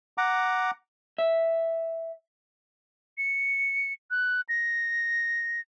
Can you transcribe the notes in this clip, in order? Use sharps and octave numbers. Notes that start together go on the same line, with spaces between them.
F#5 A#5 D6
E5
C#7
F#6
A#6